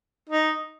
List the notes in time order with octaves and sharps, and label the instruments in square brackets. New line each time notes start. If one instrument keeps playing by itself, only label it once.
[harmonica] D#4